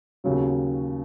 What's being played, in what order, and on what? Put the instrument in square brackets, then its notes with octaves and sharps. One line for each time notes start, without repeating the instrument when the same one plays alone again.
[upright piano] D#2 C#3 F#3